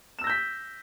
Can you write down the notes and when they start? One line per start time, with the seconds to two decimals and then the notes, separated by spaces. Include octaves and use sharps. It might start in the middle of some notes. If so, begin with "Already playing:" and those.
0.19 E7
0.21 E6
0.24 A#6
0.27 G6
0.30 B6